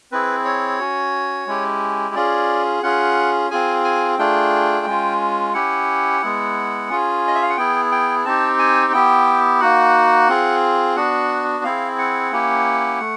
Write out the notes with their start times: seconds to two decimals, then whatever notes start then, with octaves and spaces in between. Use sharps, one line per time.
0.12 C4 E4 G#4 B4
0.45 C#5
0.79 C#4 F#4
1.47 G#3 C#4 E4 G4
2.15 C#4 F4 G#4 D5
2.83 C#4 F4 G#4 F#5
3.51 C4 F4 G#4 G#5
3.85 G#5
4.18 A3 D4 F4 G#4 G5
4.86 G#3 C#4 F4
5.54 C#4 E4 G4 F#5
6.22 G#3 B3 E4
6.89 C#4 F4 G#4
7.28 D#5
7.35 E5
7.42 F5
7.50 F#5
7.57 B3 E4 G#4 G5
7.92 G5
8.25 C4 D#4 G4 A5
8.59 G#5
8.93 B3 E4 G4 G5
9.61 A#3 D#4 F#4 F#5
10.29 C4 F4 G#4
10.96 B3 D4 F#4 F#5
11.64 C4 E4 G#4 F5
11.99 F#5
12.32 A#3 C#4 E4 G4
13.00 A3